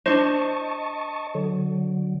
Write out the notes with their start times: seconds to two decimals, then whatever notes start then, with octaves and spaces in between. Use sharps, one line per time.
0.06 D4 D#4 C5 D#5 A5 C#6
1.35 D3 F#3